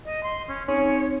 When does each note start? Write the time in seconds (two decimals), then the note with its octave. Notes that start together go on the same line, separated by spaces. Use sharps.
0.05 D#5
0.23 C6
0.48 C#4
0.68 C4 C#4 D#4 G#4 C#5